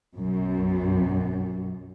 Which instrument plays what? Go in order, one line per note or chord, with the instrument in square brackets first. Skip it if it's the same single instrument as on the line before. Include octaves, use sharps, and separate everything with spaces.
[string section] B1 F#2